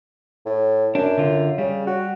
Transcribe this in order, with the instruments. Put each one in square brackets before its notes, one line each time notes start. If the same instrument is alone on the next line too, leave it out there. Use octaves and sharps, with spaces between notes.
[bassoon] A2
[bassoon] F#2 [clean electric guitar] D4
[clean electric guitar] D3 F4
[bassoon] C#3 [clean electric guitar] G3
[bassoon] F#4